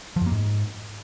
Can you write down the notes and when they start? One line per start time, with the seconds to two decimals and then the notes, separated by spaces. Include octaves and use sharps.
0.16 F3
0.21 F#2
0.26 A#3
0.31 G#2